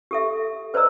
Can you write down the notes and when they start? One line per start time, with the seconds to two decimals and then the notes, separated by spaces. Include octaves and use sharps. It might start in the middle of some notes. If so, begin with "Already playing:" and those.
0.11 G4 A4 E5
0.74 B4 C5 D5 D#5 A#5 E6